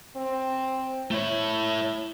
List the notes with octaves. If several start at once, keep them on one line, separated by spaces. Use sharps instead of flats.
C4
A3 E4 C#5